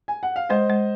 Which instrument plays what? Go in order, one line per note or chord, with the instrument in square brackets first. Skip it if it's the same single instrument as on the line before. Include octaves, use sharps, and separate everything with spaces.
[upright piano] G#5
F#5
F5
[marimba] G#3 [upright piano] C5 D#5
[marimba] G#3